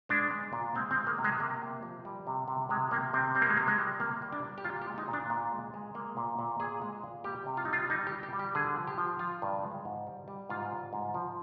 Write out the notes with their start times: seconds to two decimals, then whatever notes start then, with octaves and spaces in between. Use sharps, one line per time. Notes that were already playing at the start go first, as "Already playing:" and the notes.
0.09 G#3 D4
0.31 G#3
0.53 A#2
0.75 G#3 C4
0.91 C4
0.96 G#3
1.07 A#3
1.18 C3
1.24 G#3
1.40 C3 A#3
1.62 C3
1.83 F3
2.05 G3
2.27 C3
2.48 C3
2.69 C3 G#3
2.91 C3 A#3
3.13 C3 C4
3.35 G3 C4
3.42 A#3
3.50 G#3
3.57 C3 A#3
3.68 G#3
3.78 G3
4.00 C3 A#3
4.22 G3
4.32 D4
4.44 G3
4.58 G4
4.64 A#2 F4
4.82 G4
4.87 G#3
4.98 D#4
5.08 A#2
5.13 D4
5.30 A#2
5.52 G#3
5.74 G#3
5.95 G#3 A#3
6.17 A#2
6.39 A#2
6.60 A#2 G#4
6.82 G#3
7.04 A#2
7.24 G3 G4
7.46 C3
7.57 F4
7.65 D#4
7.68 G3 F4
7.90 G3 D#4
8.07 G4
8.12 G3
8.23 G4
8.33 G3
8.39 G4
8.55 D3 G#4
8.76 F3
8.87 G4
8.98 F3
9.19 F3 F4
9.42 G2
9.63 G#3
9.85 G#2
10.07 G3
10.28 G3
10.49 G#2 F4
10.71 G3
10.93 G#2
11.14 F3